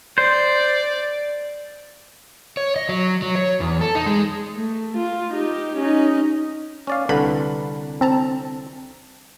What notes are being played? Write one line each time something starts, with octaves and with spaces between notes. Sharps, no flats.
C5 D5
C#5
D#5
F#3
F#3
C#5
E2
A4
D#4
G#3
A3
F4
D#4 G4
C#4 D#4
C#4 D5 F5
C2 D3 B4 B5
C4 A5 A#5